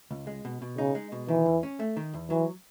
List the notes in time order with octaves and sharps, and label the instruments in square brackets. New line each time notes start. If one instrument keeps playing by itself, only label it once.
[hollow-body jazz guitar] C#2
G#3
B2
B2
[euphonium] C#3 [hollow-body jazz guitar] D#4
[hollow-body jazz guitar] G#3
B2
[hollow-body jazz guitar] D#3 [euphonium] E3
[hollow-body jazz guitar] E2
C#4
A3
D#3
E2
[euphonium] E3 [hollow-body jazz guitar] F#3